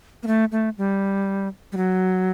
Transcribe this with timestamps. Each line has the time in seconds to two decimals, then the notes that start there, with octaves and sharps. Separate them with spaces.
0.23 A#3
0.27 A3
0.52 A3
0.78 G3
1.72 G3
1.77 F#3